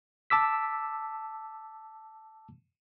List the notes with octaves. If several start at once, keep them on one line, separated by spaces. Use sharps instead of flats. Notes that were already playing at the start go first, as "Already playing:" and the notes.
A5 D6 E6 B6